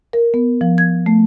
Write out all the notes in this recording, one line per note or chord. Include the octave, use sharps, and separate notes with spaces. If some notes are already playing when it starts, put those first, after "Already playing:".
A#4
B3
F3
G#6
A3